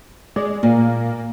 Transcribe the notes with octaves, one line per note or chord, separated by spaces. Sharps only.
G#3 D5
A#2 A#3